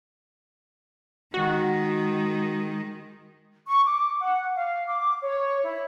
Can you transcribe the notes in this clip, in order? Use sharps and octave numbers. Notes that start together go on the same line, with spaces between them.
D#3 G#3 F#4
C#6
D6
F#5
F5
D6
C#5
E4